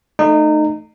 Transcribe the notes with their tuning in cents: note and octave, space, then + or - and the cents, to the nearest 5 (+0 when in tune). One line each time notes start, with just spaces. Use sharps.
A3 +0 D#4 -25